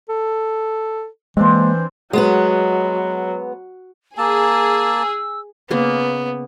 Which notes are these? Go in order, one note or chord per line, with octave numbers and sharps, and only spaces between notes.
A4
E3 G#3 A#3 C4 D4 C5
F#3 G#3 B3 B4
A#3 G#4 A5 E6
C#3 A#3 B3